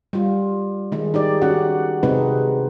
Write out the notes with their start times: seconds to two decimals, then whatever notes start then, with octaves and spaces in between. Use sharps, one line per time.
0.13 G3 F4
0.92 D#3 G#3
1.14 D#4 G4 D5
1.42 C#4 F#4 F#5
2.03 C3 G#3 C4 D#4 B4